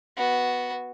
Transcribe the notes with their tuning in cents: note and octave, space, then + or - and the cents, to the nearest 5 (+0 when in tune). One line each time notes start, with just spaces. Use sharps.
B3 +0 F#4 +0